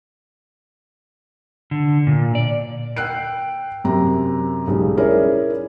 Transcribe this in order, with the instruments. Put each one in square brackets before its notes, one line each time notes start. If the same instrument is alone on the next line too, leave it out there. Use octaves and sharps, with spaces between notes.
[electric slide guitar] D3
A#2
D5
[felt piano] G5 E6 F#6 C7 D7
F#2 C3 A#5
B1 C#3 G3 G#3
C#4 E4 G#4 A#4 C#5 D5